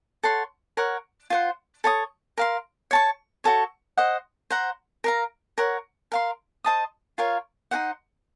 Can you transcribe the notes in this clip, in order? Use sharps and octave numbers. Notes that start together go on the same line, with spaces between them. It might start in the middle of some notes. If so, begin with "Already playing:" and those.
A4 C#5 F#5 C6
A#4 C#5 F#5
F4 C5 F#5
A4 C#5 A5 D#6
A#4 F5 C6
C#5 A5 C#6
F#4 A4 C#5
C5 D#5 F#5
C5 F#5 A#5
A#4 F5 A#5
A#4 C#5 F#5
A#4 F5 C6
C5 D#5 A5 D#6
F4 A#4 C#5 F5
D#4 F#4 C5 F#5